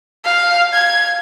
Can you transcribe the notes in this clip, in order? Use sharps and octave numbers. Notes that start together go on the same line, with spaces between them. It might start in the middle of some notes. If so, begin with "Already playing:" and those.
F5
G#6